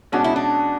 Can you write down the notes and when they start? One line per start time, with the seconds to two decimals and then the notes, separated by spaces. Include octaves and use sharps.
0.12 B2 G#3 C#4 D4 F#4
0.24 E4
0.36 D4